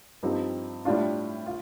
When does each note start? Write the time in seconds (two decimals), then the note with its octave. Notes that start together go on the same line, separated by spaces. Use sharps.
0.23 G2 F3 C4 D#4 G4
0.85 A2 G3 D4 F4
1.46 F4